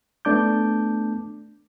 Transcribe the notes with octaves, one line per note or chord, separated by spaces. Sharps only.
A3 B3 D4 A5 D6 G6